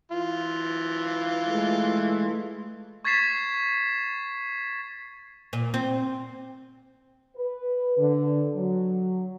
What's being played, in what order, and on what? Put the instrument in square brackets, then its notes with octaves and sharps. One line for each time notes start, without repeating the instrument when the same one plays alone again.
[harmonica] E3 F4
[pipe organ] G#3 A3
[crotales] C#6 G#6 A6 B6 C7 E7
[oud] A#2
C4
[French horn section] B4
D3
F#3